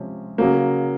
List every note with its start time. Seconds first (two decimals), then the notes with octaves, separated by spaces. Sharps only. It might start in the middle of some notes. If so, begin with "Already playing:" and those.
Already playing: C3 F3 G#3 C#4
0.38 C#3 F#3 A#3